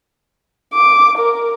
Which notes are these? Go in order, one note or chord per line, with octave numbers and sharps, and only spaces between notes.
D6
A#4